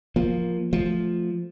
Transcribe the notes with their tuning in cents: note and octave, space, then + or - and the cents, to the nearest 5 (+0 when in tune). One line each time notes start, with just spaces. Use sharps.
F3 +0 A#3 +15
F3 +0 A3 +0